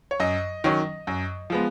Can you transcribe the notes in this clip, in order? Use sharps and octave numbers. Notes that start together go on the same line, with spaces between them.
C#5
F#2 D#5
D#3 F#3 C#4
F#2
F3 G#3 B3